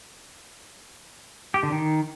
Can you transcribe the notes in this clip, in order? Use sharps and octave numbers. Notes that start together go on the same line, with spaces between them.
G4
D3
D#3